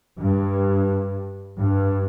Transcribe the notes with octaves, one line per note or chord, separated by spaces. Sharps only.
G2
G2